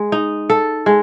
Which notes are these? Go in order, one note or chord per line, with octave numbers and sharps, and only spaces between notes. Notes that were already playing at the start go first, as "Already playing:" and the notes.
Already playing: G#3
D#4
A4
G#3